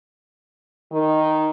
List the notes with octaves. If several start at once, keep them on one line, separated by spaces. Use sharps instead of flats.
D#3